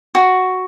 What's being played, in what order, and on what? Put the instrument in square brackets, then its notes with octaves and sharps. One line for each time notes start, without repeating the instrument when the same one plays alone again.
[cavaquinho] F#4